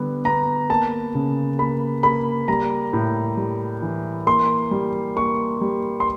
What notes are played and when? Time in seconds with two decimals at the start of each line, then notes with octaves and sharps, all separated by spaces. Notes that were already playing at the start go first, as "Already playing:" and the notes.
Already playing: D3 G3 B3
0.25 B3 A#5
0.70 A#3 A5
1.15 C#3
1.59 A#3 B5
2.03 A#3 B5
2.48 G3 A#5
2.93 A2
3.37 G3
3.82 E3
4.27 A#3 C6
4.71 G3
5.16 A#3 C#6
5.61 G3
6.00 C6